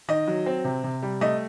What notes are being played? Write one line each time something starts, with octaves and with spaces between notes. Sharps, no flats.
D#3 D#5
F#3
C4
C3
C3
G3
A3 D#5